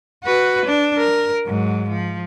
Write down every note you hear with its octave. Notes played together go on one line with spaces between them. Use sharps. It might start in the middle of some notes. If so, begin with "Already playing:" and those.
F#4 B4
D4
A#4
G#2 F#3
F3